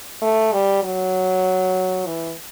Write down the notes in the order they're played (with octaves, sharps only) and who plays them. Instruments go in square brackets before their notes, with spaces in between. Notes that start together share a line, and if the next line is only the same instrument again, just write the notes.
[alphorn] A3
G3
F#3
E3